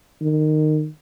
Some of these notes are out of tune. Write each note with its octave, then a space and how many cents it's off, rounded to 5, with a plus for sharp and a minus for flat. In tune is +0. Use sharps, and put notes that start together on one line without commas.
D#3 -20